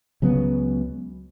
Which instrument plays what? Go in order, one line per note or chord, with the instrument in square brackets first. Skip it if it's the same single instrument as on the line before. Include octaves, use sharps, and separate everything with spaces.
[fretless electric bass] C#2 C#3 F#3 B3